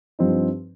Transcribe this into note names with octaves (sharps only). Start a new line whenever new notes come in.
G2 F3 C4 D#4